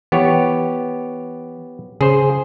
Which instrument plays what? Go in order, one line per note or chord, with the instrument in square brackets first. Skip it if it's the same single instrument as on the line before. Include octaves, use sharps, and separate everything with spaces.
[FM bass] E3 [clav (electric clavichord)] B3 G4 C#5
[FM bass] C#3 [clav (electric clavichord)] G#4 C5